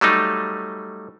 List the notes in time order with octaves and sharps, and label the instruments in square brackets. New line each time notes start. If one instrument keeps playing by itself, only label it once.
[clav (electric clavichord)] F#3 G3 A3 D#4